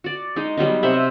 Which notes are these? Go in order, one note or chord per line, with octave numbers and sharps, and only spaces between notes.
F#4 D5
G#3 D#4
F#3 G3 B3 D#4
C3 C5 E5 F#5